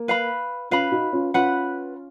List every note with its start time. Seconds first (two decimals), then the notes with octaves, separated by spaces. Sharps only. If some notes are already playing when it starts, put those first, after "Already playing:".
Already playing: A#3
0.08 B4 F5 B5
0.71 C#4 F4 B4 F5 B5
0.91 D#4 F#4
1.13 C#4 F4
1.34 C#4 F4 B4 F#5 B5